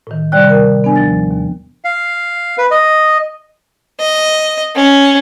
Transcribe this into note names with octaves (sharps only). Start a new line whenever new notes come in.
A2 D#3
C3 G3 D5 G5 F#6
A#4
B3 D4 G#5
D#2 F3 A6
D#2
F5
B4
D#5
D#5
C#4